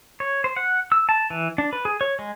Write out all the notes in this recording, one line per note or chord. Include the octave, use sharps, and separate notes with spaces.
C#5
C5
F#5
E6
A5
E3
D4
B4
G#4
C#5
G#3